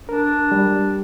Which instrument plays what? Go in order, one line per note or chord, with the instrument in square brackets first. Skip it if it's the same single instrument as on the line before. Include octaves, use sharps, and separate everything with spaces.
[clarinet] D4 [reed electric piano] A#4
[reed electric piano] G3